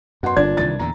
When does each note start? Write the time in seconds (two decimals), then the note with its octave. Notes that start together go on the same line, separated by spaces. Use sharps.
0.23 F#2 B2 F#5 C6
0.37 G1 A#2 D4 G#6
0.57 C2 D#3 E3 A6
0.79 E2 A#2 D3 A#5